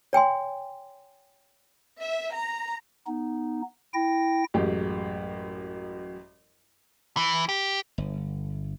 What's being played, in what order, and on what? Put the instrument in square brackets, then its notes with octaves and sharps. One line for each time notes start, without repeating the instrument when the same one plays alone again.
[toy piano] C#5 G5 G#5 C6
[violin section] E5
A#5
[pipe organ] B3 D#4
E4 G5 A#6
[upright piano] A1 F#2 G#3 G4
[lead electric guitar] E3
G4
[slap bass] G1